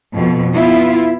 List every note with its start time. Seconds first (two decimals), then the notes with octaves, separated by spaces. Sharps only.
0.14 F2 B2
0.54 B3 E4 F4